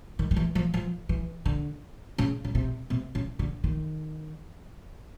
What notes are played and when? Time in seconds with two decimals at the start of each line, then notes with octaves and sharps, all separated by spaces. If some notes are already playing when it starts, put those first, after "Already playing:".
0.19 D#3
0.31 D#3
0.36 E3
0.55 F3
0.74 F3
1.09 E3
1.46 D3
2.18 C#3
2.44 C#3
2.55 C3
2.90 C3
3.15 C#3
3.39 D3
3.64 D#3